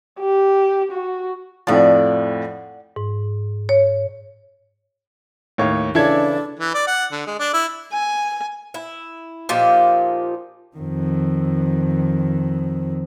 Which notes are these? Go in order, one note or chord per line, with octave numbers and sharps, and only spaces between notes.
G4
F#4
F2 A2 F3 D5 F#5
G#2
C#5
D#2 A2 C#5 F5
C#3 E3 D4 E4 A4 G#6
E3
D5
F#5
D3
G#3
D4
E4
G#5
E4
A#2 F3 D#4 G4
F2 D#3